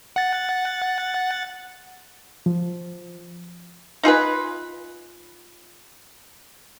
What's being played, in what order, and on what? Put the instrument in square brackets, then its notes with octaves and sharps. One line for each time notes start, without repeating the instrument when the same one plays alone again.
[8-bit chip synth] F#5 A6
[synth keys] F3
[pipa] D#4 F4 G#4 B4